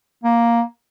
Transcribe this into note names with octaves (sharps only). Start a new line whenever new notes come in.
A#3